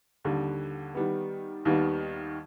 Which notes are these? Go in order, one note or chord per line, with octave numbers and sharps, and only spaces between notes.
D#2 D3 G3
D#3 G3 B3
D#2 D#3 G3 B3